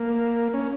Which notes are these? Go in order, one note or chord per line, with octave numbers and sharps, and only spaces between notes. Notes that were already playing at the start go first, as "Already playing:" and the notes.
Already playing: A#3
C#4